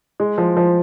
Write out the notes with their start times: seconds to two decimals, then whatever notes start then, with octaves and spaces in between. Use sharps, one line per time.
0.20 G#3
0.38 F3
0.57 F3